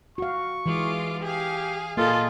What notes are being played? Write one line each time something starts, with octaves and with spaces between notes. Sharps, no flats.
F#4 F5 C#6
E3 G#3 F4 D6
G4 G#4 F5
A#2 A#3 F4 G#4 A4 D#5